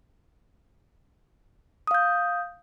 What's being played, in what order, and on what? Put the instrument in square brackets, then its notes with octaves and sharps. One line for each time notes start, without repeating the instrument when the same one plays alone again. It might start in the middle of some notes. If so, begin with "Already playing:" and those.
[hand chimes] D#6
F5
G6